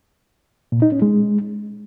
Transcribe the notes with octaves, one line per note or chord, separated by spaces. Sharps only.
A#2
D#4
C#4
G#3